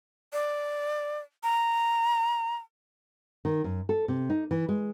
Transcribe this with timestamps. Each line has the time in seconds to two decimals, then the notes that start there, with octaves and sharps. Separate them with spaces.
0.33 D5
1.44 A#5
3.45 D#3
3.64 F#2
3.89 A4
4.08 C3
4.30 D#4
4.51 E3
4.69 G#3